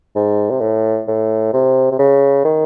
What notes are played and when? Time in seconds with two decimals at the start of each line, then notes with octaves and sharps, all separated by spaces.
0.15 G#2
0.50 C3
0.61 A2
1.08 A2
1.53 C3
1.91 C3
1.99 C#3
2.45 D#3